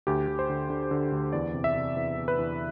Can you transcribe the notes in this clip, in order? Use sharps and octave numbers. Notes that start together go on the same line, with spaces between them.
D2 G4
D2
C5
D3
D3
D3
D2
E2 D5
C3
E5
C3
E2
E2
B4
E2